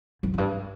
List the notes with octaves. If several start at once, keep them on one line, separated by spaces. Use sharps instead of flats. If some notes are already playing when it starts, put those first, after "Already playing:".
F#2
F#2
G2